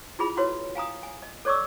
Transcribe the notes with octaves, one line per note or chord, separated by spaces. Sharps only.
E4 F4 G#4 B5
E4 F#4 B4 C#5
F5 G#5 A#5 D#6
G#5
D#5
A4 C#5 D5 C#6 D6 E6